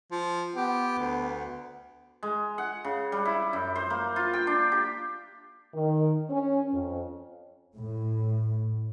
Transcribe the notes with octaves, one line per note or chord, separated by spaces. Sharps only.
F3
B3 G4
D2
G#3
F#5
C#3
G3
E4
F#2
C5
A#3
F4
G5
D4
G4
D#3
C#4
F2
A2